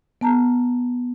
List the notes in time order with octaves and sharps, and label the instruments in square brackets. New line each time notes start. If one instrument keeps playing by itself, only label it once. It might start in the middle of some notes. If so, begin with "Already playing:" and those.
[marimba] B3 A5 A#5